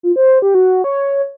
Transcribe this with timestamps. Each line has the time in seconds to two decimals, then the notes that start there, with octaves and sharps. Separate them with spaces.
0.03 F4
0.16 C5
0.42 G4
0.55 F#4
0.84 C#5